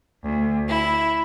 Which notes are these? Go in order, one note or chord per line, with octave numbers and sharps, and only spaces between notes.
D2
E4